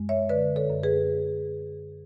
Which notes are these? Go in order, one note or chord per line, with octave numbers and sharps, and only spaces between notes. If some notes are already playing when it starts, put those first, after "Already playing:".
Already playing: F#2 G#3
C#5 E5
D3 B4 D5
A4 C#5
F#2
G#4 B4